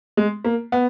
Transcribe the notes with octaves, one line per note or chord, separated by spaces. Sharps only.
G#3
A#3
B3